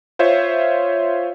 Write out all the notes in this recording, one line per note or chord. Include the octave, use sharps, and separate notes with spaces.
F4 C5 C#5 E5